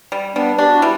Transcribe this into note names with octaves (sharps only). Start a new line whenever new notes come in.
G3
G3 B3 D4
D4 G4
F#4
G3 E4